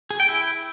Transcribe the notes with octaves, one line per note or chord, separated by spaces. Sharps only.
G#4
G5
E4